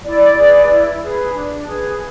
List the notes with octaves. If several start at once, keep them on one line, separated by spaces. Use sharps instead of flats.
E4 D5
G#4 B4
E4
G#4 B4
D4
G#4 B4